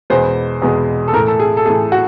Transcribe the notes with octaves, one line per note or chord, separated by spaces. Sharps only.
E2 B2 G#3 B3 C5
E2 B2 G#3 B3
A4
A2 E3 A3 A#4
A4
G#4
A4
A2 E3 A3 G#4
F#4